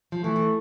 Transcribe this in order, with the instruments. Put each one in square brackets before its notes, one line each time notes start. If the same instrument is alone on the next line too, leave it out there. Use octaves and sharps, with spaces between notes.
[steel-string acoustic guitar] F3
[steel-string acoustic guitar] E3 [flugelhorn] A3
[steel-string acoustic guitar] E3